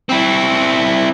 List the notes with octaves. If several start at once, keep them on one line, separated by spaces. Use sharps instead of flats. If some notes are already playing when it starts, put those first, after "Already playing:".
C4 E4